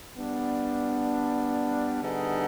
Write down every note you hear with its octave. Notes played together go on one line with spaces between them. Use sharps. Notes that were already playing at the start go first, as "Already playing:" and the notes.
G3 B3 D4
D3 G3 B3 D#4 G#4